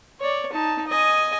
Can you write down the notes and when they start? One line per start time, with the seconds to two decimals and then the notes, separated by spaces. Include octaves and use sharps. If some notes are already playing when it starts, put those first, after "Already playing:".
0.20 C#5 D5
0.53 D#4 A5
0.87 D#5 G#5